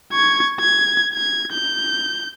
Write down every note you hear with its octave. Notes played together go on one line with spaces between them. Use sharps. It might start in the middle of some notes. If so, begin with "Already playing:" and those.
C#6 G#6
G#6
G#6
G6